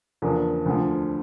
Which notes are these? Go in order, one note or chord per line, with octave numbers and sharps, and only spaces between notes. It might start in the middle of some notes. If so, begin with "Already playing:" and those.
E2 C#3 F3 A#3 D4
D2 D3 F3